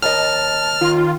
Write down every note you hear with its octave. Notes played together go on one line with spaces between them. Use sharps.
D#2 D#5 A5 F6
D#3 F4